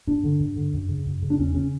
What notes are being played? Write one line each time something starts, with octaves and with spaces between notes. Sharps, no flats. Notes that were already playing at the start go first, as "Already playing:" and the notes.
G2 D4
D3
G2
D3
F#2
C#3
F#2
C#3
D4
E2 C#4
C#3 C#4